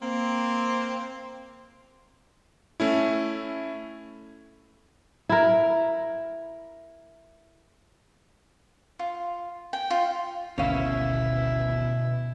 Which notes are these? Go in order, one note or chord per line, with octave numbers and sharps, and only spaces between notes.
A#3 C4
A3 C#4 E4
E4 A#4
F4
G5
F4
G#1 D2 B2 C#4 E4 F5